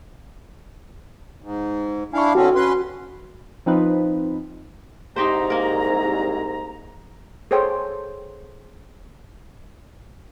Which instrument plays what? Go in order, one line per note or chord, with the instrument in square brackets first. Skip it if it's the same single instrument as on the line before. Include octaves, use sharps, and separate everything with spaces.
[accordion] G#2
[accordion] D4 E4 F5 [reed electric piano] G#5 C#6
[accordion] D3 C4 C#4 [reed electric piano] F#4
[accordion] C#4 B4 C6
[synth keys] F3 C4 D#4 F4 B4
[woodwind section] C2 G#2 A#5 [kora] D#4 G4 C5
[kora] A#3 A#4
[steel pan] G#4 A4 C5 C#5 G5